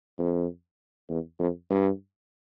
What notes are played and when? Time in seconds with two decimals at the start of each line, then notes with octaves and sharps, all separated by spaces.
0.19 F2
1.09 E2
1.39 F2
1.70 G2